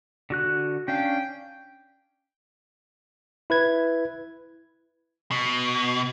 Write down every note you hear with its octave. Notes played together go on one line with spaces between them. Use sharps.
D3 F#4 F#6
C#4 D4 F5 G5
E4 B4 G#6
B2